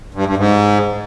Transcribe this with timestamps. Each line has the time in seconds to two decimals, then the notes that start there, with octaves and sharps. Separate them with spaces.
0.14 G2
0.26 G2
0.38 G#2